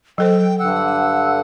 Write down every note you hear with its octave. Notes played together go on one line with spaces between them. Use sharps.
F#3 A4 C5 G5
G2 D3 F#5 E6